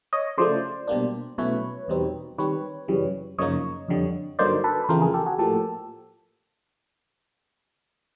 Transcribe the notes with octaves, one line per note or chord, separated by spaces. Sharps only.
C#5 D#5
C#3 F3 A3 C5 D5
B2 G3 A#3 D4
B2 F#3 A3 C#4 E4 B4 C#5
E2 B2 G3 C4 D#4
D#3 G3 C4 B4 C#5
F#2 C#3 E3 G3
F#2 C#3 F3 A#3 D#4 C#5 D#5
F2 D3 G3
G2 D3 F#3 A#3 D#4 C5 D5
A4 B4
B4
E2 C#3 F3 A3 C4 A#4 C5
G#4 A#4
G4 A4
F#4 G#4
A2 F3 A#3 G4 A4